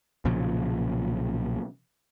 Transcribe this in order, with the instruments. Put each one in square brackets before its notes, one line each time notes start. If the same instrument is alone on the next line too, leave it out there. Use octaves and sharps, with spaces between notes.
[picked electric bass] B1 A#2 C#3 F3